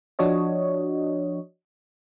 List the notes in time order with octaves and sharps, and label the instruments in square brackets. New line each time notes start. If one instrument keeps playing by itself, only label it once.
[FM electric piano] F3 D4 F#4 C#5 D#5